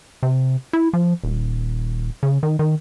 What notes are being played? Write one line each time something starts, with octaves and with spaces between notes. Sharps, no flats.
C3
E4
F3
D#1
C#3
D#3
D#3